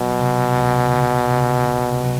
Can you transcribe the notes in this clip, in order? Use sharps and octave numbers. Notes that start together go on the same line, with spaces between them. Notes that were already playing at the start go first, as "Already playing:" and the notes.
Already playing: B2 F#3
C3
C#2
C#2
C3
C3
F#3